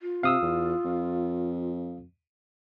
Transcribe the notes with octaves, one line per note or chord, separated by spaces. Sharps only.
F4
C3 F5 D#6 E6
E2
F2